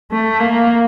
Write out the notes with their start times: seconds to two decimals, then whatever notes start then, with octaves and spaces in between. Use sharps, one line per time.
0.11 A3
0.40 A#3